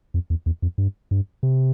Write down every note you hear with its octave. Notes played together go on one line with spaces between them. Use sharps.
F2
E2
E2
F2
G2
G2
C3